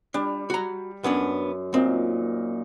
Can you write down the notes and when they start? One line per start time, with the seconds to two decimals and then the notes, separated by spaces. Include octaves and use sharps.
0.14 G3 D4
0.50 F#4 A#5
1.04 F#2 B3 C#4 D4
1.74 A#2 C4 D#4